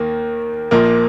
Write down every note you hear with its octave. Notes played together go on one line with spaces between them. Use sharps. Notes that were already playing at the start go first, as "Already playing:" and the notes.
Already playing: D#2 D#3 A#3
A#1 A#2 F3 A#3 A#4